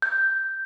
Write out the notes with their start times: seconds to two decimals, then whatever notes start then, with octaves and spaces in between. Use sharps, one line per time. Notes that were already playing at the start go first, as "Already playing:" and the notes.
0.02 G6